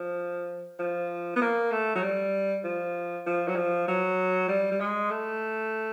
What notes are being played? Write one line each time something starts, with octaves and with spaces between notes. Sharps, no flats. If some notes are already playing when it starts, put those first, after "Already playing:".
Already playing: F3
F3
B3
A#3
A3
F#3
G3
F3
F3
F#3
F3
F#3
G3
G3
G#3
A3